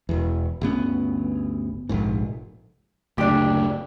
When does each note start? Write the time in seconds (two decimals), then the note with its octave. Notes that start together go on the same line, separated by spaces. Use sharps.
0.09 E1 E2
0.61 G1 D2 B3 C#4
1.89 F1 A#1 G#2
3.18 F#1 D2 D4 G4